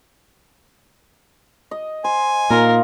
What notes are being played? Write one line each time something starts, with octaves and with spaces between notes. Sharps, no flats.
D#5
C5 G#5
A#2 D#4 F4 A#4